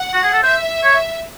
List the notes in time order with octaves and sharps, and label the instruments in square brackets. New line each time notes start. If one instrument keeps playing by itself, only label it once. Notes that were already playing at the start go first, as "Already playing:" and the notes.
Already playing: [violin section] F#5
[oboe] F#4
G#4
A4
[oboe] C5 [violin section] E5
[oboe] C#5